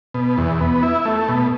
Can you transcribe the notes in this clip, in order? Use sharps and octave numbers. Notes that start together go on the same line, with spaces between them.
B2
E2
B3
E4
A3
B2